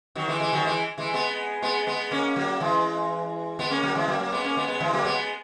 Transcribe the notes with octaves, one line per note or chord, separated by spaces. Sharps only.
D#3 F#3
E3 G#3
E3 G#3
D#3 F#3
E3 G#3
E3 G#3
G#3 B3
G#3 B3
G#3 B3
A#3 C#4
F#3 A#3
E3 G#3
G#3 B3
A#3 C#4
F#3 A#3
E3 G#3
F#3 A#3
F#3 A#3
G#3 B3
A#3 C#4
G#3 B3
G#3 B3
E3 G#3
F#3 A#3
G#3 B3